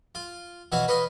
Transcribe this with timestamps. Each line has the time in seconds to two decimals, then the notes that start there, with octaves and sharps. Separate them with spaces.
0.15 F4
0.72 B2 E3 F#4 C#5 F5
0.88 B4 C#5 D#5 F5